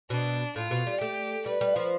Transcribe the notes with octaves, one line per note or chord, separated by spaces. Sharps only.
B2 D4
A2 F4
B2
G3
A3 G4
G3 B4
G3
F3